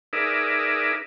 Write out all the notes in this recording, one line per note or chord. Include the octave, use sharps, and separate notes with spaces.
D#4 G#4 A#4 B4 D5 E5